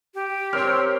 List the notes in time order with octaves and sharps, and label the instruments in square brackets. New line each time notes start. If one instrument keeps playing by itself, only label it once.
[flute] G4
[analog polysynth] C4 A#4 C#5 [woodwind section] C6 E6 [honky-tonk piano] F6